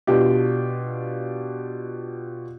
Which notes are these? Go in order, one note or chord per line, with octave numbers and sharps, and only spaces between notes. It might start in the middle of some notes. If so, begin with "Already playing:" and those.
B2 D4 F4 G4